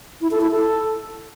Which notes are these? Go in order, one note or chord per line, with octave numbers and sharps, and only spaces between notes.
E4
A4
E4
A4